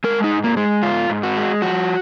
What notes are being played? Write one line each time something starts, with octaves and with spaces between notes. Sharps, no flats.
G#3 A#4
D#4
G#2
A#3
G#3
G#2 F4
G#2
F#4
G#3
F3 F#4